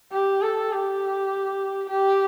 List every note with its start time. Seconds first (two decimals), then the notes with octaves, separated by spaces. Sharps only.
0.12 G4
0.42 A4
0.72 G4
1.89 G4